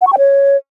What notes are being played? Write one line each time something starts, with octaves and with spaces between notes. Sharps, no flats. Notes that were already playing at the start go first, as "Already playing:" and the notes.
F#5
C#6
G5
C#5